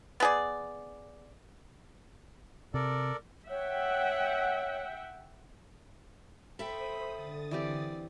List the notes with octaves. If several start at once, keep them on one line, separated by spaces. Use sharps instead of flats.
B3 G#4 D5
C3 A4 A#4 D5
C#5 E5 F#5 G5
A4 C5 E5 G5 B5 D#6
D3 D#6 A6
E3 C4 G4 D5